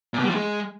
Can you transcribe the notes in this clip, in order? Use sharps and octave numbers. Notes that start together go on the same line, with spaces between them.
A#2
B2
G3
F3
G#3